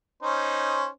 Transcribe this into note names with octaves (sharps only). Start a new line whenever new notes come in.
C#4 D#4 C5